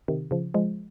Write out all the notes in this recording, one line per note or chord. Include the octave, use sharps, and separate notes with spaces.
C3 D#3
C#3 F3
F3 G#3